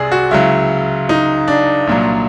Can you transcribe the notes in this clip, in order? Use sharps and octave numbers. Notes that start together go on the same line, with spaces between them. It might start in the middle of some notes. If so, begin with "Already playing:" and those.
Already playing: C2 C3 G#4 D5
F#4
C#2 C#3 F#3 E4
D#4
D4
C2 A#2 F#3